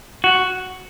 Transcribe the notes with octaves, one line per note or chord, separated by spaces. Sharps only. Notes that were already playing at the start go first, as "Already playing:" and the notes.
F#4